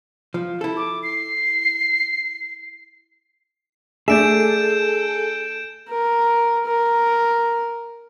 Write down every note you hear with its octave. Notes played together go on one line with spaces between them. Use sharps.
F3
E4 A4
D6
C7
A3 D4 G#4 A4 E5 G6 D7 E7
A#4
A#4